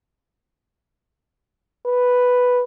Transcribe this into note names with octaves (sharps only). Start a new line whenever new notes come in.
B4